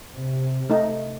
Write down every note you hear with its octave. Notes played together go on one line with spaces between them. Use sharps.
C3
A3 D#4